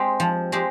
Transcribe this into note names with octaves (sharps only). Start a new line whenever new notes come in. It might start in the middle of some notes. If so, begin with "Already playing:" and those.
Already playing: G#3 C4 G4
F3
G#3 C4 G4